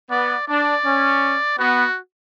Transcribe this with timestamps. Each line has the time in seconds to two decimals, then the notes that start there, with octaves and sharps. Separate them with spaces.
0.11 B3 D5
0.48 D4 D5
0.85 C#4
1.58 B3 F#4